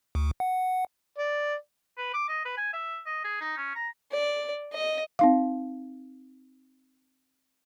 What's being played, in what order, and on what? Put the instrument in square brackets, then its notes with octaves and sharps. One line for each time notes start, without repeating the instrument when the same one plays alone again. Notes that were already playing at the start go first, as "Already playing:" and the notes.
[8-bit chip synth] D2
F#5
[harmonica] D5
[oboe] B4
D6
D#5
B4
G#5
E5
D#5
G#4
D#4
C#4
A#5
[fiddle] D5
D#5
[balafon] C4 D#4 F5